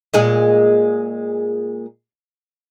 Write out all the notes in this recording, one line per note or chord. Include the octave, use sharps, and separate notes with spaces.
A#2 G#3 G#4